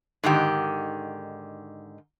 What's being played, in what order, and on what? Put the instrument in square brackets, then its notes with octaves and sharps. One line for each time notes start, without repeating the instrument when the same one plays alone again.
[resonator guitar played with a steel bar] G#2 D3 D#3 G4